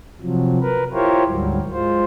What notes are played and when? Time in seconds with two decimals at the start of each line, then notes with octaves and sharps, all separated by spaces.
0.21 C3 F3 F#3
0.61 A#4 B4
0.93 E4 F4 G4 A#4 C5 C#5
1.26 D2 G#2 F#3 G3
1.72 G#3 F4 C5